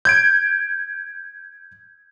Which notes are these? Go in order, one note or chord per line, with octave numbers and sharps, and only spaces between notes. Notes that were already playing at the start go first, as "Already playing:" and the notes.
G6 G#6 D7